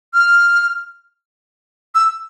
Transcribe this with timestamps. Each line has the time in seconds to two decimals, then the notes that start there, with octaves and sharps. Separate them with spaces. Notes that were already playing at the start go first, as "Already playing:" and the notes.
0.14 F6
1.95 E6